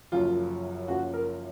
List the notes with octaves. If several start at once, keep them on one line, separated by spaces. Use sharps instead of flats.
F#1 F#2 F3 F4
F#1 F#2 F3 F#4
A#4